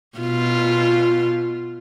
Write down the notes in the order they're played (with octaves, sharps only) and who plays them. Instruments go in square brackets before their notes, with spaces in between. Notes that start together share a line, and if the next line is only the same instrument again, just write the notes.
[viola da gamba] B2 F4